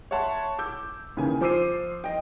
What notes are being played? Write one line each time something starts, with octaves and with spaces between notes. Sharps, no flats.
C#5 E5 F#5 A5 C6
D6 E6 G6
D#2 C#3 E3 G#5
F3 C5 D6 E6 C7 D#7
D#5 G5